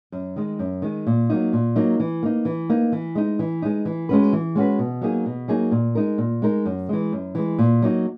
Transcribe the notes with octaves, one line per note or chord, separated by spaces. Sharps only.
F#2
D#3 G#3
F#2
D#3 G#3
A#2
F#3 A#3 D#4
A#2
F#3 A#3 D#4
E3
A#3 D#4
E3
A#3 D#4
E3
G#3 D#4
E3
G#3 D#4
E3
G#3 C#4 F#4 B4
E3
G#3 C#4 F#4 B4
B2
F#3 A#3 D#4 G#4
B2
F#3 A#3 D#4 G#4
A#2
G#3 D#4 A#4
A#2
G#3 D#4 A#4
F#2
E3 G#3
F#2
E3 G#3
A#2
F#3 A#3 D#4